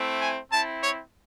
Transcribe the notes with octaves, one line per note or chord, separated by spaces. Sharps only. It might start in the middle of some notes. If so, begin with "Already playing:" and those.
Already playing: A3 C4 E4
G#5
C4 E4 A5
C#5